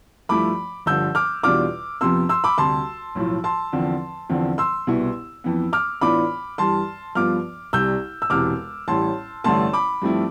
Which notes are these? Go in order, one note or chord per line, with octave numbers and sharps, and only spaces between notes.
G2 F3 A3 E4 B5 D6
G1 G2 D3 F3 E6 G6
D6 F6
E2 B2 G3 D4 F4 D6 F6
F2 C3 F3 B3 C6 E6
C6 E6
B5 D6
D2 C3 G3 A5 C6
B1 A2 F3
A5 C6
E2 D3 F3 C4
E2 D3 F3 C4
C6 E6
C2 B2 B3 E4
F2 E3 B3
D6 F6
A2 E3 B3 D4 F4 B5 D6
G2 E3 G3 A5 C6
G2 F3 B3 F4 D6 F6
C2 C3 G3 E6 G6
E6
E1 E2 C3 E3 D6 F6
A1 A2 G3 A5 C6
A1 G2 D3 A3 A5 C6
B5 D6
G2 F3 A3 C4 E4